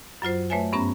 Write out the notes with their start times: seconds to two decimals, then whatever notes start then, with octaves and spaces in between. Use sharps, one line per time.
0.22 F#2 F#3 F4 C5
0.50 A3 B4 C#5 E5 G#5
0.73 G2 B3 C#4 A#5